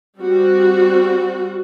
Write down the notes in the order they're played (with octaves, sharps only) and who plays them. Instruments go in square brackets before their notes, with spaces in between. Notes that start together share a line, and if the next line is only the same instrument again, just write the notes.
[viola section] G3 C4 F#4